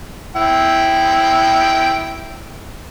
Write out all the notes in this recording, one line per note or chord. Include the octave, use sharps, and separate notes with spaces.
E4 G5